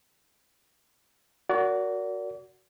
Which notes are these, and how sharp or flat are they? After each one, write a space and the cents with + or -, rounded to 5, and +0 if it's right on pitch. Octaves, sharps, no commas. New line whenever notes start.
F#4 +0 A#4 +0 D5 -35